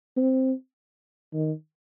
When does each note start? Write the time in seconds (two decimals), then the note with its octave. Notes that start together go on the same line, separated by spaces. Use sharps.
0.17 C4
1.34 D#3